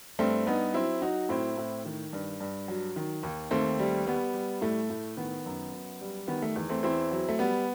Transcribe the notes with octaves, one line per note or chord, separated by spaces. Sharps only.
G2 A3 C4
G2 B3 D#4
F#3 C4 E4
F#3 D#4 F#4
A2 C4 E4
A2
D#3
G2
G2
F#3
D#3
D#2
D#2 A3 C4
G3
G3 B3
G3
A2 A3
A2
D#3 B3
F#2
F#2
G3
D#3 B3
A3
E2
A3 C4
E2 C4 E4
F#3
A3
G3 B3